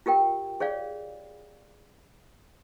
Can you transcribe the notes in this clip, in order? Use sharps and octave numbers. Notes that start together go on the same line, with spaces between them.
F4 G4 A#4 G5
G#4 C#5 D5 F5